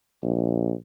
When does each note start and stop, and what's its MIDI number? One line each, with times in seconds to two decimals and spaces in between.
0.23 0.73 34